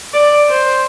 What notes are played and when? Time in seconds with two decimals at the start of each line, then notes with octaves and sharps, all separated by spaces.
0.14 D5
0.50 C5